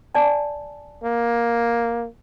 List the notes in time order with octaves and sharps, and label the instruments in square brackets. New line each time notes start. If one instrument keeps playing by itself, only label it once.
[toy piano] D5 G#5 A5
[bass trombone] A#3